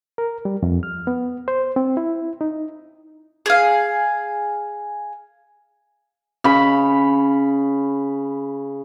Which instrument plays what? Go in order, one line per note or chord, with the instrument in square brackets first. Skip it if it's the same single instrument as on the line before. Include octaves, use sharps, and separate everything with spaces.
[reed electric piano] A#4
G3
F2
F6
B3
C5
C4
E4
D#4
[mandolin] G#4 F5
[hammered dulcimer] C#3 B5